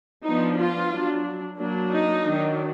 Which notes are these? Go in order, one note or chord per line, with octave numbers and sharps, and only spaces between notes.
F3 B3 D4 D#4
F4
F#3 D4
F#3 A#3 D4
D#4
D#3 F#3 D4